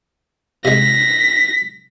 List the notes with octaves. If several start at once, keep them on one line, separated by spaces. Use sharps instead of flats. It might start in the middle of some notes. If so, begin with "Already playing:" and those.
C3 G#3 A#6 B6